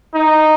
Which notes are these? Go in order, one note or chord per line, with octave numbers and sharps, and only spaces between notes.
D#4